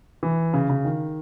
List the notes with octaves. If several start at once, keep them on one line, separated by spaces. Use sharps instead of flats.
E3
C#3
C#3
D#3